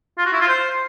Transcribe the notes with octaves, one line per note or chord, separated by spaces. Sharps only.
F4
F#4
E4
F4
C5